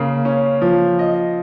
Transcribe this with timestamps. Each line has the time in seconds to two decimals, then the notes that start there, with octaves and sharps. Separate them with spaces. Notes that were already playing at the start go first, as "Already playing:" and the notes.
Already playing: C#3 A#3
0.25 C#4
0.61 F3
0.99 D#5